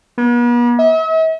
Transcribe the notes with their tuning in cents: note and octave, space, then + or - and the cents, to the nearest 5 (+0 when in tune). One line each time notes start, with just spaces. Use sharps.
B3 -45
E5 -45